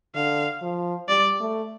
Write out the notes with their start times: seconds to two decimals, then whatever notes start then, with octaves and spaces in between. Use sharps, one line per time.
0.15 D3 F5
0.62 F3
1.08 G3 D5
1.40 A3